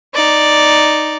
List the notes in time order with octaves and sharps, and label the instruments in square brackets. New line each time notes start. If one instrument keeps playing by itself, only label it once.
[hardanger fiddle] D#4 D5